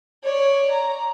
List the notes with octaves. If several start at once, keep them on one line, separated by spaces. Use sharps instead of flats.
C#5 D5
A#5